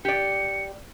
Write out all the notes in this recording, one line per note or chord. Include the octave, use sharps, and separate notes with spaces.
G4 D5 C#7